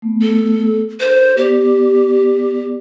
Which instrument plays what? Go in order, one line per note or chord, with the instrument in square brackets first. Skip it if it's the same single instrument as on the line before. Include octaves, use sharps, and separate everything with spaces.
[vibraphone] A3 B3
[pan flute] A4
[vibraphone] D4 A4 A#4 [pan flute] C5
[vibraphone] B3 D5 D6 [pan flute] G4